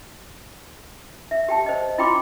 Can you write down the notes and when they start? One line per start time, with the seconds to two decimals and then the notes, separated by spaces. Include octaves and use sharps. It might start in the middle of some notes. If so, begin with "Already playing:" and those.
1.31 E5
1.49 G4 G5 A5
1.66 C5 D#5
1.98 E4 F4 G5 B5 C6 D6